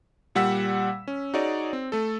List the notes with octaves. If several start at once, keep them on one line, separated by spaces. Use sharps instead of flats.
A#2 G3 F#5 E6 B6
C#4
D#4 F#4 G#4 C#5 D5
C4
A3 A4